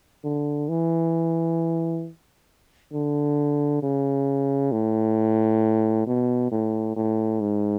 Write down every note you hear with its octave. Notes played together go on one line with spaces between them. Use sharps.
D3
E3
D3
C#3
A2
B2
A2
A2
G#2